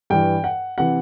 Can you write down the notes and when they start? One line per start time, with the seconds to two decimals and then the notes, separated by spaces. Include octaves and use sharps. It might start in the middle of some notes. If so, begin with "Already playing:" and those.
0.10 G2 E3 G5
0.44 F#5
0.78 C3 E3 F#5